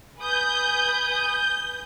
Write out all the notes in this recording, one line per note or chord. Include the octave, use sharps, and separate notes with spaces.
B4 G#5 D#6 G6